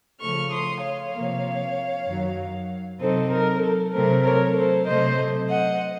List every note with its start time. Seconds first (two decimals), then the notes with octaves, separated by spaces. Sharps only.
0.20 C#3 F3 A3 C#6 F6
0.51 C6 D#6
0.82 C#5 F5
1.14 C3 F3 A#3
2.07 F#2 D#3 F#3
3.00 C3 F#3 C4 D#4 A4 C5
3.32 A#4
3.62 A4
3.93 C3 F#3 A3 C4 A#4
4.24 A#4 C#5
4.56 A4 C5
4.87 C3 F#3 A3 C5 D#5
5.49 D#5 F#5